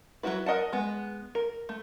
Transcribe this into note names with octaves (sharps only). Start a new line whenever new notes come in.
F#3 B3 E4 F#4 B4
A#4 D#5 F#5 A5
G#3 B3
A#4
A3